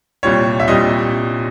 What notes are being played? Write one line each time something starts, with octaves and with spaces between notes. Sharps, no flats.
C2 A#2 G3 C#5
E5
C2 A#2 G3 D#5